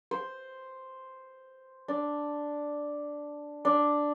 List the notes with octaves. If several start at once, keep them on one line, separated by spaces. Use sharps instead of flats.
C5
D4
D4